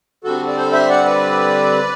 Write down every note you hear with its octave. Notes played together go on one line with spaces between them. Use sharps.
D3 G3 C4 F#4 A4
D5
A4 C5
C5 E5
D5 F#5
B4 D5